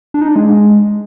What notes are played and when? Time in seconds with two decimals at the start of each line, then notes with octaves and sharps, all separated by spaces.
0.14 D4
0.21 D#4
0.29 D4
0.36 G#3